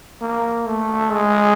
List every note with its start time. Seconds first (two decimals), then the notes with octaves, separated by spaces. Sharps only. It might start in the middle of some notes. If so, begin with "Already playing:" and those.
0.22 A#3
0.67 A3
1.12 G#3